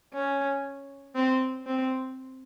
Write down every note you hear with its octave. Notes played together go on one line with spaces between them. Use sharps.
C#4
C4
C4